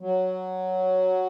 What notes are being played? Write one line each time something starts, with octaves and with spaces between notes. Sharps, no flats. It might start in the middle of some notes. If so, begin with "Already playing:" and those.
F#3